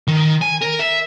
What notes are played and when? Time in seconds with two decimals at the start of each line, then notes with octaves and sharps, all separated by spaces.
0.08 D#3
0.42 G#5
0.62 A#4
0.80 E5